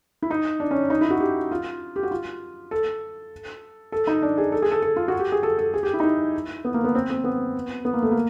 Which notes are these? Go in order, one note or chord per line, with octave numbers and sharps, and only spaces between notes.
E4
D#4
D4
C#4
D#4
E4
F#4
G4
F4
G4
F#4
F4
A4
A4
D#4
D4
G#4
A4
G#4
A4
A4
F4
F#4
G4
G#4
A4
A4
G#4
G4
E4
D#4
E4
B3
A#3
B3
C4
C4
B3
B3
A#3
A3
A#3